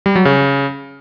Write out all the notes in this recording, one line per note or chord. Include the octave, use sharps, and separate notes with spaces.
G3
F#3
C#3